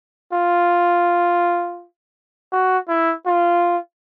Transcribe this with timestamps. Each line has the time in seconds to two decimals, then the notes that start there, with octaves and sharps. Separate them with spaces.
0.33 F4
2.52 F#4
2.88 E4
3.26 F4